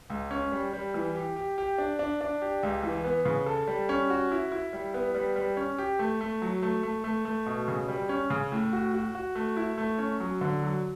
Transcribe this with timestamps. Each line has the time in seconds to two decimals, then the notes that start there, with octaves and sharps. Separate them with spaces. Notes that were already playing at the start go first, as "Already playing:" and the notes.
0.10 C#2
0.31 C#4
0.52 G3
0.73 G3
0.94 E3
1.15 G4
1.36 G4
1.58 G4
1.78 D4
1.99 D4
2.21 D4
2.42 G4
2.63 C#2
2.83 E3
3.04 B3
3.25 C#3
3.46 A4
3.68 G3
3.89 C#4
4.10 F#4
4.31 E4
4.52 E4
4.73 G3
4.94 B3
5.15 G3
5.36 G3
5.57 C#4
5.78 G4
5.99 A3
6.21 A3
6.42 F#3
6.62 A3
6.83 A3
7.04 A3
7.25 A3
7.46 B2
7.68 C#3
7.88 G3
8.09 C#4
8.30 C#3
8.52 A2
8.73 F#4
8.94 F#4
9.15 F#4
9.35 A3
9.57 E4
9.78 A3
9.99 C#4
10.20 F#3
10.41 D3
10.62 F#3